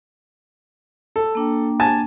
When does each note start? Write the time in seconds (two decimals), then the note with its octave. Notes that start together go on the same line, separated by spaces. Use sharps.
1.16 A4
1.35 A#3 D4 G5
1.80 G#5 A5